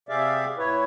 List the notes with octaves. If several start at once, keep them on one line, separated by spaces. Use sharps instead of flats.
C3 G4 G#4 D5 E5 F5
A2 E4 B4 C#5